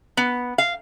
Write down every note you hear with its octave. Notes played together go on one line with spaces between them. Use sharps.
B3
F5